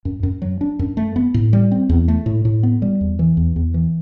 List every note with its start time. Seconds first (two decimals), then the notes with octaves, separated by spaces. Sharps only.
0.05 F#2
0.23 F#2
0.42 F#3
0.61 D4
0.79 F#2
0.97 A3
1.16 B3
1.34 A2
1.53 G3
1.72 C4
1.89 E2
2.08 A3
2.26 A2
2.45 A2
2.63 B3
2.82 G3
3.01 E2
3.19 E3
3.37 E2
3.56 E2
3.74 E3